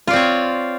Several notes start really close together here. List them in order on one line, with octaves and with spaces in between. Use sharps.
F4 D5 C4 C#5